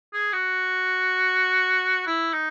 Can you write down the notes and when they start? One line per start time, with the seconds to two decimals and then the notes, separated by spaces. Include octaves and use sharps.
0.14 G#4
0.33 F#4
2.07 E4
2.33 D#4